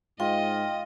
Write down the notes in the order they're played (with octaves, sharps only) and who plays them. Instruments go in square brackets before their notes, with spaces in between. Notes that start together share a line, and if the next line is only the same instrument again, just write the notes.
[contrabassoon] G#2 [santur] F4 [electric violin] D#5 [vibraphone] G5